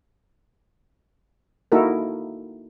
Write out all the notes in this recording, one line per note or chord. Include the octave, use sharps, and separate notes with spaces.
A#3 D#4 E4 F#4 A4 A#4